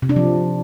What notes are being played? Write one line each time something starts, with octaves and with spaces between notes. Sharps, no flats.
C3
D4
F3